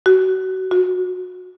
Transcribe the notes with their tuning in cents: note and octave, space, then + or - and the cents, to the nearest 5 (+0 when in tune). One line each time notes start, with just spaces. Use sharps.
F#4 +25
F#4 -20